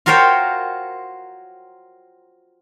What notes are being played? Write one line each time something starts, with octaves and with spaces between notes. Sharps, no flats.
F4 F#4 A#4 C5 C#5 G5